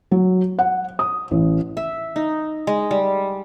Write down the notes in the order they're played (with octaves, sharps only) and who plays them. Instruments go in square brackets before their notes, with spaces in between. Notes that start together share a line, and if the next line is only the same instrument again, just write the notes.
[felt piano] F#3
F#5
D#6
A1
[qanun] E5
D#4
G#3
G3